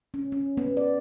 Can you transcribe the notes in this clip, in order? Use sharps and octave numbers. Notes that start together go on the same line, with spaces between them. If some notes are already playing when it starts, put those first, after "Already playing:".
C#4
C#4
B3
D5